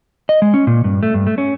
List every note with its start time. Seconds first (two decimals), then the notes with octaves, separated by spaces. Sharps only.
0.29 D#5
0.42 G#3
0.54 C#4
0.67 A#2
0.84 G2
1.03 A3
1.14 G2
1.27 A3
1.38 C#4